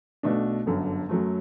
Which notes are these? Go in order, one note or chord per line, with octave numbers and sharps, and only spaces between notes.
B1 B2 A3 D4
G1 F#2 D3
F#2 F#3 A3